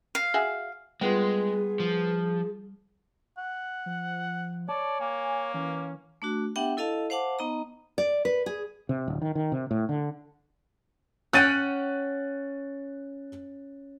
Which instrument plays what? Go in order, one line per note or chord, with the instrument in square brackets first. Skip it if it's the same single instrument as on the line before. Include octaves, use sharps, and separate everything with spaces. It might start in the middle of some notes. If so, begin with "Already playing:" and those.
[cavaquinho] F5
[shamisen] F#4 G#4 E5
[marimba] G3 [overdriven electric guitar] G#3 [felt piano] B3 F4 [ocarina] G#4
[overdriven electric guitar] F3
[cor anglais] F#5
[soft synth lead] F3
[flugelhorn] C#5 [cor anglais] D5 [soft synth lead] A5
[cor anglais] A#3 [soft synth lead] G#5
[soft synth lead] E3 [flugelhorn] C#4
[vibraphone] A3 D4 F#4
B3 D4 G4 E5 F#5 G5
E4 A4 D#5 F5 A5
C5 F5 F#5 A5 D6
B3 D#4 D#5 A#5
[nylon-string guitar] D5
B4
G#4
[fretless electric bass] C3
D1
D#3
D#3
C3
A2
D3
[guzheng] C#4 F#5 G5 [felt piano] F#6 A6 D#7